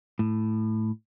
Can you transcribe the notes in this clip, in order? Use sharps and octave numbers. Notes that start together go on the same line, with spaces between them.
A2